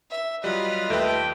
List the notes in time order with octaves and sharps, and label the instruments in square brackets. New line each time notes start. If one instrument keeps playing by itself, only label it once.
[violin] E5
[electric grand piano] F#3 G3 [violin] F4 D#5 [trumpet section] B4
[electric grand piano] D#2 B4 [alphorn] A3 [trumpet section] G5